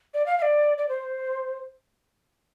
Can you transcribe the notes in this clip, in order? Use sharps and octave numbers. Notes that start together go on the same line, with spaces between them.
D5
F5
F5
D5
D5
C5